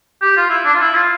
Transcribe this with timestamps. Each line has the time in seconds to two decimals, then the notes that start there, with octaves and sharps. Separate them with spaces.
0.22 G4
0.37 F4
0.50 E4
0.65 D4
0.74 F4
0.81 E4
0.95 F4